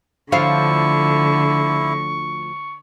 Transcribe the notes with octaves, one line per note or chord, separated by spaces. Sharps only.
D2 D3 F3 E4 F5 C#6